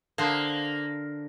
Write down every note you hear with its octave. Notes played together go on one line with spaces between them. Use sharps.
D3 A#3 C5 F5 A5 D#6